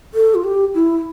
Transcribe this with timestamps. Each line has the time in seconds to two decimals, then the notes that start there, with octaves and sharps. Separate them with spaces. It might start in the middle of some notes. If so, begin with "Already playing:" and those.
0.14 A4
0.35 F4
0.44 G4
0.75 E4